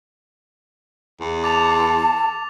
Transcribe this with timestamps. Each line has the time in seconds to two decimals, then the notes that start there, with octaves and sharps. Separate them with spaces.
1.21 E2
1.44 A5 D6 A6 F7